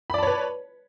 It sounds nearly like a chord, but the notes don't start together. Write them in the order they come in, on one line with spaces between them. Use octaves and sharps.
B5 D5 A5 C#5 B4